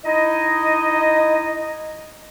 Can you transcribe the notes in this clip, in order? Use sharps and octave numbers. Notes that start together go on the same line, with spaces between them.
D#4 E4 D#5